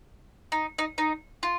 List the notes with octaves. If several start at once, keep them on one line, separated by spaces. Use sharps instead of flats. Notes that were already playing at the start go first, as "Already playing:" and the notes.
D#4
D#4
D#4
F4